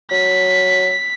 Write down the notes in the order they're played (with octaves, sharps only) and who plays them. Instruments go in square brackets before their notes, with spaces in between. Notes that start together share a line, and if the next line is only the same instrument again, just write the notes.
[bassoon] F#3 [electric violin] B6